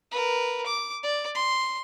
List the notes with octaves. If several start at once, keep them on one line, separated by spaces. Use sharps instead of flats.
A#4 B4
D6
D5
C6